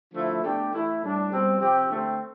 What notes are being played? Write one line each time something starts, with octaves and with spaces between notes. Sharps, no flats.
D3 F3 A3 E4
B2 A3 D4 G4
E3 A3 E4
A2 G3 D4
B2 G3 C4
C3 F3 C4 G4
D3 A3 C4